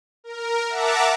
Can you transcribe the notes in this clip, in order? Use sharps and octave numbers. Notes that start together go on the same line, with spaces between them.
A#4
E5 F#5 A5 A#5 D6